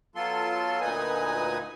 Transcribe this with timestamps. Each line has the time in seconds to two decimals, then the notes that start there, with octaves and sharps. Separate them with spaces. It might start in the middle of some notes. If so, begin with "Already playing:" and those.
0.15 F#3 B3 F4 A4 C6
0.81 D2 A#2 D#4 B4 G#5 D#6